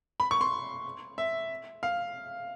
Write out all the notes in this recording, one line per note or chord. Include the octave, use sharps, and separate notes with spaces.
B5
C#6
C6
E5
F5